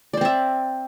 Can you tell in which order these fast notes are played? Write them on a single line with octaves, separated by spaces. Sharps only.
D5 C5 C4 E5